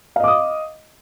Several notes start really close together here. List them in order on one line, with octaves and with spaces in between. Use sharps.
F5 D#5 D6 D#6